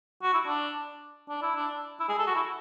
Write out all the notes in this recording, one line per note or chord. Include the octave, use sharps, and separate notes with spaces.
F#4
E4
D4
D4
E4
D4
E4
G#4
A4
F#4
E4